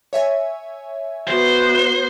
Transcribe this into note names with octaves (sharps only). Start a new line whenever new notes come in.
C#5 E5 G#5
B3 F#4 C5